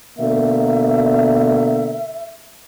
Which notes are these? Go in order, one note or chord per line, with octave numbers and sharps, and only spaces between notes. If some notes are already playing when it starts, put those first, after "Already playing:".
B2 D3 A#3 E5